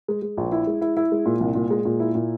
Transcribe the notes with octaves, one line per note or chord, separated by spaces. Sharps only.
G#3
G#3
A#1
E4
G#3
E4
E4
G#3
A#2
C2
A#2
G#3
A#2
E4
A#2